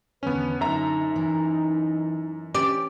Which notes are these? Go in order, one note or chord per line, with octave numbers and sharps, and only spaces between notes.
E2 D3 D#3 B3 C#4 B4
F#2 D3 D#4 E5 A#5
E3
C#4 G4 D5